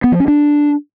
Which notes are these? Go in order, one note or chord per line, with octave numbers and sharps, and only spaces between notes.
B3
F3
C#4
D4